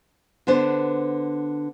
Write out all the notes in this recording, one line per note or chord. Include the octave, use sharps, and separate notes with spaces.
D3 B3 D4 C5